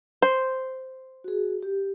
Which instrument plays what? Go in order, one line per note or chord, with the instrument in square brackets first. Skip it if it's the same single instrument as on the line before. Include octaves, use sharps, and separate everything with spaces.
[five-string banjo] C5
[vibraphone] F#4 G#4
G4